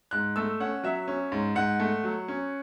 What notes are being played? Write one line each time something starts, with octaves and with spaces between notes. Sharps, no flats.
G#2 F#6
A3 E6
C#4 F#5
F#3 E5
C#4
G#2
G#2 F#5
A3
F#3
C#4